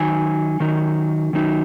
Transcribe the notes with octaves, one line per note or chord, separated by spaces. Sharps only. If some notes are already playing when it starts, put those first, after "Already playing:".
Already playing: D#3 F#3 D#4 G#5
D#3 F#3 D#4
D#3 F#3 D#4